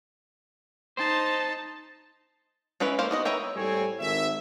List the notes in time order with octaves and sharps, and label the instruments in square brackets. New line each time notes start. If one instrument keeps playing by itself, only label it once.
[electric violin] D#4 A5 [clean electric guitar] C5
[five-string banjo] G#3 C#4 E4 B4 C#5
A#3 C5 F5
B3 F#4 D#5
A#4 B4 C#5 E5 G5
[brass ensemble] A2 G3 A3 C4 C#5 G#5
G#1 E5